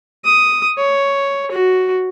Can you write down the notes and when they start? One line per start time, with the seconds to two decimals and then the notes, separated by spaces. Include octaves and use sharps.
0.25 D#6
0.78 C#5
1.51 F#4